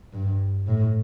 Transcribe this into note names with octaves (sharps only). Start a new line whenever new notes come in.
G2
A2